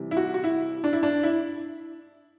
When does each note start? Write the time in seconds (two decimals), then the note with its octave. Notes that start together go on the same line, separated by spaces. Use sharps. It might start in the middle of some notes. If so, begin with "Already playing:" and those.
Already playing: C3 E3 G3
0.11 E4
0.17 F#4
0.34 F#4
0.44 E4
0.84 D4
0.93 E4
1.03 D4
1.23 E4